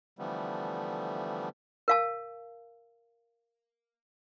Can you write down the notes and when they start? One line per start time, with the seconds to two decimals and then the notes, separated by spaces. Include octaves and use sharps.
0.19 D3 E3 F3 G3 A3 B3
1.88 A#4 F5 A5